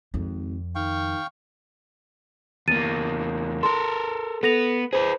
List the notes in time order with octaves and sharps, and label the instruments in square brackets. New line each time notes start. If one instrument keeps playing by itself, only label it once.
[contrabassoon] G#1 [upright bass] F2
[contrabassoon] D#3 [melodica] F5 G5 C#6
[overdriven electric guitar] E2 A#3 [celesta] A6 D#7
[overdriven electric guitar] A4 A#4 [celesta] C6
[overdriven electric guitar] B3 [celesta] A4 A#6 F7
[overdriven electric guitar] G#4 B4 [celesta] C5